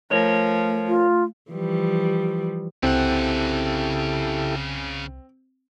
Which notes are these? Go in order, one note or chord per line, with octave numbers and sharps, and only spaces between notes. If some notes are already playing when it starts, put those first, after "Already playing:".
F3 A3 A#4 C#5
F4
E3 F3 G3
C2 C#3 C4 E4 G4 A4 F#5